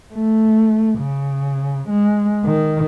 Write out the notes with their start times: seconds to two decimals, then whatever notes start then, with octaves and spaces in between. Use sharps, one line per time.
0.13 A3
0.99 C#3
1.89 G#3
2.45 D#3